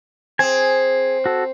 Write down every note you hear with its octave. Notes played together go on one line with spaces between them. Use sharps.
C4 G#4 G#5
F#4 A4